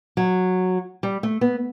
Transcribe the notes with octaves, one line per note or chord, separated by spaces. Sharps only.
F#3
G3
A3
B3